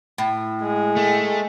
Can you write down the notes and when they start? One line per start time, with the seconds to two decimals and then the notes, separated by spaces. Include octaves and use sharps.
0.18 A2
0.62 G#3
0.96 A3